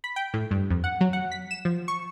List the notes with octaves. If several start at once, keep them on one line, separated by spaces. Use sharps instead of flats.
B5
G5
A2
G2
F2
F#5
F#3
F#5
B6
E7
F3
C#6